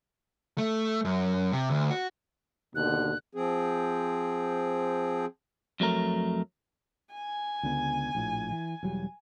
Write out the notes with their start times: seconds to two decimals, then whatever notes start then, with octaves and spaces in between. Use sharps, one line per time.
0.58 A3
1.05 F#2
1.52 C3
1.70 D2
1.91 F#4
2.75 D#2 B2 D3 F#6
3.35 F3 C4 G#4
5.80 F2 F#3 A3 A#4
7.13 G#5
7.63 C#2 D3 B3
8.15 A#1 A2
8.51 E3
8.83 E1 F#3 G3